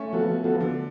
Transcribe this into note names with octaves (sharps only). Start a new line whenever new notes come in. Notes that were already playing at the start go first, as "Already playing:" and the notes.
Already playing: A3 C#4
F3 B3 F#4 A4
F3 B3 F#4 A4
D3